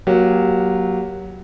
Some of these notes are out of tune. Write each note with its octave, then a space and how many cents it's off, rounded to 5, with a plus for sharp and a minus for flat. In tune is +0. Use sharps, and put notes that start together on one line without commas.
F#3 +0 A#3 +20 G4 +0